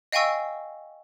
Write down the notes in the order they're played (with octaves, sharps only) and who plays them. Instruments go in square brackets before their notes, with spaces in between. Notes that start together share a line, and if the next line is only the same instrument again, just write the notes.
[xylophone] D#5 F5 G5 G#5 C#6 E6